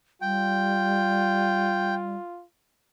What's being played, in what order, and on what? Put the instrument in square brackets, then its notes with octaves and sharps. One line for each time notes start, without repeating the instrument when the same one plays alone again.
[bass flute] G3 [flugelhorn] F4 [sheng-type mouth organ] G5